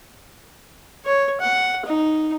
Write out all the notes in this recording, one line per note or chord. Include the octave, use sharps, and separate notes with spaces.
C#5
F#5
D#4